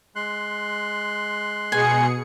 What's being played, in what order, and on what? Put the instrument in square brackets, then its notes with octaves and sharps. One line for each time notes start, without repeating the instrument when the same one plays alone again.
[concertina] G#3 C6 F#6
[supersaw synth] B2 G#4 C#7 [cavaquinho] G#5